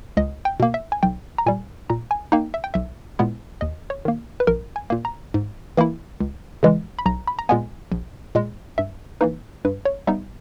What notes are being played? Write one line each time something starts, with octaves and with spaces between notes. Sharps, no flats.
C#2 D#5
G5
B2 A#3
E5
G#5
B1 G5
A#5
A#2 G3 G#5
A#2 A#5
G#5
A#3 D#4 G5
E5
G5
B1 E5
A#2 G#3 B3 E4
D#2 D#5
C#5
D#3 A#3
B4
A#1 A#4
G#5
A#2 A#3
A#5
G#2
E3 A#3 E4
C#2
C#3 E3 G#3
B5
B1 A#5
B5
A#5
A#2 G#3 B3 G#5
A#1
A#2 G#3
G2 E5
E3 A#3 D#4 B4
G2 B4
C#5
G3 B3 D#4 E5